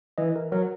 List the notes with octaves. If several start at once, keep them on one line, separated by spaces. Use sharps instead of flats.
E3 D#5
A#4
F#3 A#4